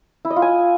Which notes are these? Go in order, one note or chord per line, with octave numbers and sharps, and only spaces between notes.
E4
D#5
F4
G#5